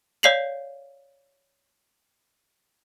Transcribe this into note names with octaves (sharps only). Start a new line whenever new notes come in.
C#5 D5 F5 C7 F7 F#7